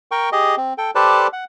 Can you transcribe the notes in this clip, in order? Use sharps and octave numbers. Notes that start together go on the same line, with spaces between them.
A#4 G5 C#6
G4 G#4 D#5
C4
A4 G5
G4 A4 B4 C5 D5 A5
F#5